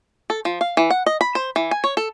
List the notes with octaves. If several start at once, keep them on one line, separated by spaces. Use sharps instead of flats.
A4
F3
F5
E3
F#5
D#5
B5
C5
E3
G#5
C#5
A4